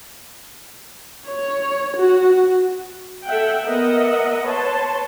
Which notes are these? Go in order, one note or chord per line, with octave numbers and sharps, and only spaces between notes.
C#5
F#4
A4 E5 F#5 G5
B3 A#4 D#5 E5 F#5
B4 C#5 A5 C6